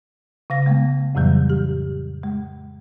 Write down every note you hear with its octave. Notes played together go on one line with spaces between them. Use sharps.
C#3 F5 A#6
G#3 A3 B3
F2 A2 C#3 E3 F#3 G3
G4
G#3